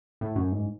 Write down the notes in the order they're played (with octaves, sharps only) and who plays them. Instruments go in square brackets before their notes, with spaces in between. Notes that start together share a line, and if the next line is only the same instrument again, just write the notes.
[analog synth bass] A2
F#2
G#2